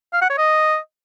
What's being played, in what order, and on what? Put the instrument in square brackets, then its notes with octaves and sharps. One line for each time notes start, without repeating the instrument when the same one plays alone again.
[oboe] F5
F#5
C#5
D#5